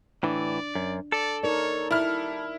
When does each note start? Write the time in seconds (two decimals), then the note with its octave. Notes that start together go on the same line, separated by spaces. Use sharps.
0.23 A2 E3 D4 D5
0.75 F#2
1.12 A4 D5
1.43 D#4 A#4 C#5 D5
1.91 G3 E4 F6